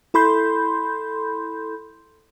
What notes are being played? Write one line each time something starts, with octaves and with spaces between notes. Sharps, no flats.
E4 A4 B5 C6 G6